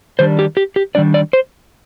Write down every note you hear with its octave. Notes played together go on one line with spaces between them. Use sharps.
D#3 G3 D4 C5
G4
G4
G4
D#3 G3 D4 D5
D5
C5